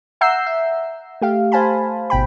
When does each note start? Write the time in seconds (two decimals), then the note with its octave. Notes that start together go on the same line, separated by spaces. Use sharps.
0.21 E5 F#5 A#5 E6 G6 C7
0.46 E5
1.21 A3 G4 F5
1.52 C5 F5 G#5 A5 B5
2.10 G#1 B2 G5 B5